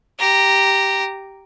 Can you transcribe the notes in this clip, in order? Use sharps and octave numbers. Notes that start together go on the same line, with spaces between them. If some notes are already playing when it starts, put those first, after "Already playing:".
G4 A#5